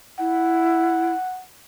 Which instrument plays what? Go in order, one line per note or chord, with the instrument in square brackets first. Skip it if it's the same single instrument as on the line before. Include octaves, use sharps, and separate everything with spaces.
[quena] E4 [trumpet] F#5